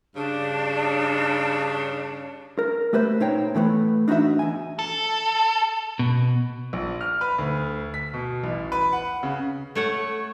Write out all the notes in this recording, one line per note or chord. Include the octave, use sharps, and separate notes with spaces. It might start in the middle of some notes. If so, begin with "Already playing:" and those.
G2 C#3 D4
A#4
A3 G4 B4 C5 E5
A#2 D#4 C5 C#5 G5
A2 E3 A3 B3
D4 D#4 F#4 B4 E5
E2 G#5
A4
B2
A#1
F6
B4
D2
B6
B2
A1
B4
F#5
C#3
A3 C#5 F#5